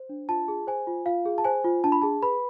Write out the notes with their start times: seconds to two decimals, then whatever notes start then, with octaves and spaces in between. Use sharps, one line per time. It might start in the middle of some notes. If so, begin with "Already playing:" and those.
Already playing: C5
0.09 D4
0.29 F4 A5
0.48 G#4
0.67 C5 G#5
0.87 F4
1.06 F4 F5
1.25 G#4
1.38 A5
1.44 C5 G#5
1.64 F4
1.84 D4 A5
1.92 B5
2.02 G#4 A5
2.22 B4 B5